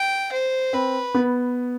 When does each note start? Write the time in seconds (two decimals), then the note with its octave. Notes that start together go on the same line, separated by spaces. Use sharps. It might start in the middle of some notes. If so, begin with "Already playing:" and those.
Already playing: G5
0.32 C5
0.73 C4 B4
1.14 B3